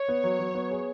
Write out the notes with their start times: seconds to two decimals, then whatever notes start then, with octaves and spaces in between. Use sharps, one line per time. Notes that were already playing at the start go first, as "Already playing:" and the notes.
Already playing: C#5
0.08 B3
0.24 F#3
0.39 F#3
0.55 B3
0.71 G#4